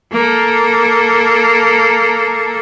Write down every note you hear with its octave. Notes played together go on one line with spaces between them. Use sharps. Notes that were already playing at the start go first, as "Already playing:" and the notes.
A#3 A4